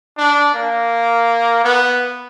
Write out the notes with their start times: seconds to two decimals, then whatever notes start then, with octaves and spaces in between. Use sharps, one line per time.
0.18 D4
0.54 A#3
1.64 B3